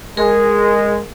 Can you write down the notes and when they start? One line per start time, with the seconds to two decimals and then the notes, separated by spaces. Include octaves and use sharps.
0.17 G#3 G#4 A#4